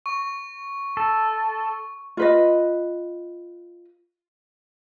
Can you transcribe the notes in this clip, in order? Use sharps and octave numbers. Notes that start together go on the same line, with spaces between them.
C#6
A4
F4 B4 D#5